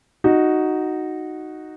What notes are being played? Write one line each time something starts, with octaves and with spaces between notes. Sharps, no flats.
D#4 F#4